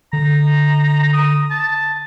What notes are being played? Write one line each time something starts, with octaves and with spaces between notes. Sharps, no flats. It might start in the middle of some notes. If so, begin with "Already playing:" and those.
D3 A#5
D#6
A5